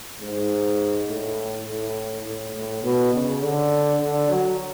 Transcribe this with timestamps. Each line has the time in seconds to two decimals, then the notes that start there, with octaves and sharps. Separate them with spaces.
0.20 G#2
1.08 A2
1.67 A2
2.25 A2
2.55 A2
2.83 B2
3.13 C#3
3.42 D3
4.00 D3
4.29 F#3